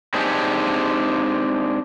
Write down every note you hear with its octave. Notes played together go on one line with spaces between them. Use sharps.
G#3 C4 D4 D#4 G4 G#4